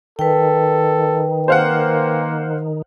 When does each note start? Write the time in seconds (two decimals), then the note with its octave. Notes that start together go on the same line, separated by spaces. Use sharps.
0.19 D#3 A4 B4 G5
1.48 A#3 C5 F5 F#5